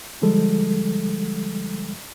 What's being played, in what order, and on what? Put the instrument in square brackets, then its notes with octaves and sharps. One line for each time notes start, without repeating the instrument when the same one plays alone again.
[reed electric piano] D3 F3 G3 G#3 A4